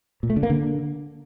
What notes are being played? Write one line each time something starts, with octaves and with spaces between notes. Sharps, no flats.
A#2
A3
D3
A#3
D3